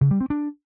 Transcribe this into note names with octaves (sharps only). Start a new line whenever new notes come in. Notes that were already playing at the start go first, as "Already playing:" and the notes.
C#3
G3
C4
D4